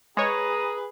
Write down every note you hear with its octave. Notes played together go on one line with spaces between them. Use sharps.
G#3 G#4 B4 C#5 A#5 D#6